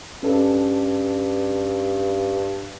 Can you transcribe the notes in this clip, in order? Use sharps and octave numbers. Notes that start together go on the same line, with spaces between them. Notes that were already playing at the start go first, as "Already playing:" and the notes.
G2 C#4 A4